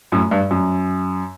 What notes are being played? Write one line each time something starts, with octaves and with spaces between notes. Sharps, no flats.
F#2 A2
G2
F#2